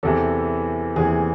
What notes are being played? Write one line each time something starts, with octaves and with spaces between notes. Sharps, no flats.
E2 C3 E3 A4
E2 C3 E3 G#4